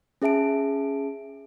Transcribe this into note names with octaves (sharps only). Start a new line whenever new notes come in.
C#4 G#4 E5 A5 D7